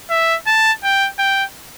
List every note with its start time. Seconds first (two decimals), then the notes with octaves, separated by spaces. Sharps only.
0.10 E5
0.47 A5
0.83 G5
1.19 G5